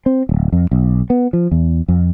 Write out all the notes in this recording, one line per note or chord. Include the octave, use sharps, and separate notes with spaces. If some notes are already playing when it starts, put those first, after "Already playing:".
C4
D1
F2
B1
B3
F3
E2
F2